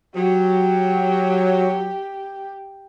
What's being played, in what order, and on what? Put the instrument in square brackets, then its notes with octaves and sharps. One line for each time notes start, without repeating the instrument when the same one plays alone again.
[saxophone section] F#3 [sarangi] G4